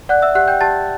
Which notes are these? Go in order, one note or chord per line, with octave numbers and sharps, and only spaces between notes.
D5 F#5 F#6
E5 E6
G4 F#5 F#6
G5 G6
G4 A5 A6